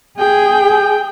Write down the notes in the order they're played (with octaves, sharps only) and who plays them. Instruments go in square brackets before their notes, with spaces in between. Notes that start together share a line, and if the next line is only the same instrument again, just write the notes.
[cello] G#4 [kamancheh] G5